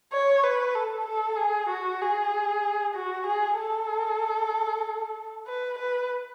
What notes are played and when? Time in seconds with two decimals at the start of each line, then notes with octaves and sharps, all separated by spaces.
0.12 C#5
0.43 B4
0.75 A4
1.06 A4
1.37 G#4
1.69 F#4
2.01 G#4
2.94 F#4
3.27 G#4
3.57 A4
5.46 B4
5.78 B4